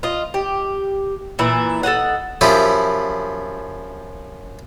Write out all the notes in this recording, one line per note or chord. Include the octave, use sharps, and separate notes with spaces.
F4 D#5
G4
A#2 E3 E4
A4 A#4 D#5 F#5
F#2 F3 E4 G4